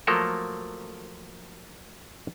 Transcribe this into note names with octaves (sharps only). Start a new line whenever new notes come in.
F3 F#3 A3 A#3 A4 A#4